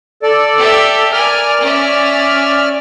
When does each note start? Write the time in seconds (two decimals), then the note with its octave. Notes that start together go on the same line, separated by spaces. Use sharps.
0.23 A4 D5
0.57 G4 E5
1.13 A#4 D5 G#5 F6
1.60 C#4 E5